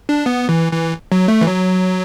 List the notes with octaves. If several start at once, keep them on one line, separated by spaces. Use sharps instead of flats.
D4
B3
E3
E3
F#3
A3
E3
F#3